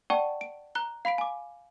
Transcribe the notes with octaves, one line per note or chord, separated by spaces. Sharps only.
D5 F#5 G5 A5 C#6
D7
A#5 F#6 G7
F5 B5 B6 D7
G#5 D6